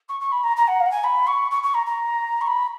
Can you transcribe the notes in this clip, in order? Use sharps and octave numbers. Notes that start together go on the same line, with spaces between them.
C#6
C#6
B5
A#5
A#5
F#5
F5
F#5
G#5
B5
C#6
C#6
C#6
A#5
A#5
C#6
B5